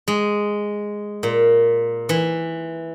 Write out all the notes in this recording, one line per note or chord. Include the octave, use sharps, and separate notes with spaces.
G#3
A#2
E3